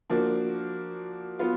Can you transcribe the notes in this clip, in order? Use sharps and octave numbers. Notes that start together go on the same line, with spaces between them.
F3 A#3 D4 F#4
F#3 B3 F4